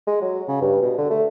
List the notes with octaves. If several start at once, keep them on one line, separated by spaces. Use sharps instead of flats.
G#3
F#3
C#3
G2
B2
D3
A3